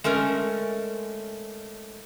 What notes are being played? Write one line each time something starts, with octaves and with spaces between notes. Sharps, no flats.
G#3 A3 C#4 A#4